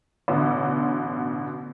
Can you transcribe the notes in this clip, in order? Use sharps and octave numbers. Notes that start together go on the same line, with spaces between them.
A1 B2 D3